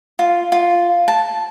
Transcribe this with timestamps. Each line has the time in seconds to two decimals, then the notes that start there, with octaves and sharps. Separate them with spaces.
0.19 F4
0.52 F4
1.08 A5